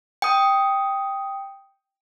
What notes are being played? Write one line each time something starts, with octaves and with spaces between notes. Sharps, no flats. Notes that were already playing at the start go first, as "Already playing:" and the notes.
G5 D#6